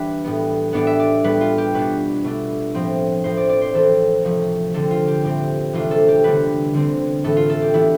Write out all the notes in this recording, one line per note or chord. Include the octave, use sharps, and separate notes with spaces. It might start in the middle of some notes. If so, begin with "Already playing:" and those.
Already playing: E3 G3 D4 B4
A2 G3 B3
A2 G3 B3 D4 D5
E5
D5
A2 G3 B3 B4
F4
G4
B2 B3 D4 B4
B2 A3 D4
A2 F3 C4
A2 F3 C4 C5
D5
D5
C5
E3 A3 C4 A4
C3 F3 A3
D3 G3 C4 A4
F4
G4
A2 G3 C4 G4
C3 E3 A3 D4 F4
A4
G4
D3 G3 B3 D4 B4
D3 G3 C4
A2 E3 A3 A4
F4
A4
G4
E3 B3 D4 E4